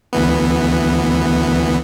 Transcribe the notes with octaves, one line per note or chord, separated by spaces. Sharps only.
D2 E3 B3